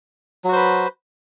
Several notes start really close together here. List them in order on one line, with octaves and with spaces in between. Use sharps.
F#3 F#4 C5 B4